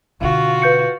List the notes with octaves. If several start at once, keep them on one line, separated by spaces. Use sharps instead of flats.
B2 D3 F4 F#4
B4 G6 C#7